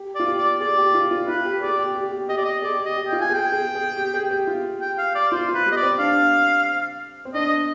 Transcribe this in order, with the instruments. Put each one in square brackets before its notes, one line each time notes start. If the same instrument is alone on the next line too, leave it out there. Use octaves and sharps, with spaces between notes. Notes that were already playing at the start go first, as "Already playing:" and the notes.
Already playing: [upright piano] G4
[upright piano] F4 [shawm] D5
[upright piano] G4
[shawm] D5
[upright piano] G#4 [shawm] D5
[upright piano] G4
F4
F4
[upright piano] F4 [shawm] B4
[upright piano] G4
[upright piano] G#4 [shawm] D5
[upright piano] G4
G4
G4
[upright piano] G4 [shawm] D#5
[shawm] D5
D#5
[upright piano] G#4 [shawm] D5
[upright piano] G4
[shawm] D#5
[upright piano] G4
[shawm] G5
[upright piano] F4
[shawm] G#5
[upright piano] G#4 [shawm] G5
[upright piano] G#4
G#4
G4
G#4
G4
F4
[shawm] G5
F5
D5
[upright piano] F4 [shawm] C5
[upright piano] F4
[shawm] B4
[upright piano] G3
[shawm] D#5
D5
[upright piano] C4
[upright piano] D4 [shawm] F5
[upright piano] C4
[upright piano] D4 [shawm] D#5